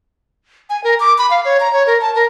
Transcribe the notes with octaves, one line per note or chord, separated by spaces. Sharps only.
G#5
A#4
D6
B5
F5
C#5
A#5
C#5
A#4
A5
A#4